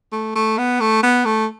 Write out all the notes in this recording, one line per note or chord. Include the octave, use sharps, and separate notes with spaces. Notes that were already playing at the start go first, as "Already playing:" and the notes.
A3
A3
B3
A3
B3
A3